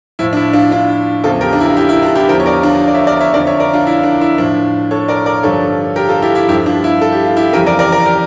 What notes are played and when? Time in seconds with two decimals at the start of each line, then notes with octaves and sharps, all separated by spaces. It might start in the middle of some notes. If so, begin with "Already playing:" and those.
0.19 A2 F3 E4
0.33 D4
0.37 E4
0.53 D4 F4
0.72 D4 F4
1.24 E2 C#3 F3 F4 A4
1.41 G4 A#4
1.53 D4
1.60 E4
1.68 F4
1.77 E4 G4
1.89 E4
2.03 D4 F4
2.15 E4 G4
2.28 E2 D3 F3 G4 A#4
2.40 C#5
2.46 A#4 D5
2.63 D4 F4
2.88 D5
2.94 C#5 E5
3.07 A#4 D5
3.21 C#5 E5
3.33 F2 D3 F3 A#4 D5
3.47 C#5 E5
3.60 A#4 D5
3.73 D4 F4
3.87 E4
4.04 D4
4.21 E4
4.38 A2 F3 D4 F4
4.91 A4 C#5
5.08 A#4 D5
5.26 A#4 D5
5.43 G2 D3 F3 A4 C#5
5.96 G4 A#4
6.08 F4 A4
6.22 E4 G4
6.35 E4 G4
6.48 G2 F3 E4 G4
6.66 D4 F4
6.84 E4
7.01 A4
7.12 G4
7.25 F4
7.36 E4 G4
7.53 F2 C#3 E3 G4 A#4
7.66 A#4 D5
7.79 A#4 D5
7.92 A#4 D5
8.06 G4 A#4